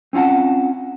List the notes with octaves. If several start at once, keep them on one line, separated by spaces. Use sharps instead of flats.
C4 C#4 F4 F#5 A5